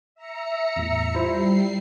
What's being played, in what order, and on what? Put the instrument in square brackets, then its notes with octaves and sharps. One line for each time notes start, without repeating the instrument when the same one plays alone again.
[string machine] E5 A#5 C#7
[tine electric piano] E2 A2
[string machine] G3 C7 [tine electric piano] E4 F4 C5